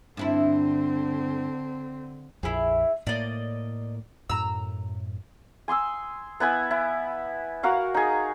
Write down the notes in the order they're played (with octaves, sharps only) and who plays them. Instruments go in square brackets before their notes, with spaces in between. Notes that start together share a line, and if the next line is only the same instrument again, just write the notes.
[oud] G2 D4 E4 [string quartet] D3 C4
[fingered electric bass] A#1 F2 [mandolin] E4 G#4
[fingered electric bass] A2 A#3 [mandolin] D5 D#5
[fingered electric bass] F#2 A2 [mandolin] A#5 E6
[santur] G#5 C6 D#6 E6
B3 E4 B4 G#5
E4
F#4 A#4 F5 F#5
D#4 G#4